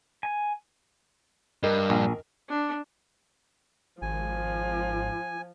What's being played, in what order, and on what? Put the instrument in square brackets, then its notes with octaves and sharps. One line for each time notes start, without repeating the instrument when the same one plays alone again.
[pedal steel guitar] G#5
[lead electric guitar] G2 [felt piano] A#4 D#5
[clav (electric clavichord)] A#1
[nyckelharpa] D4
[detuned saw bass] G#1 [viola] F3 [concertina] G#5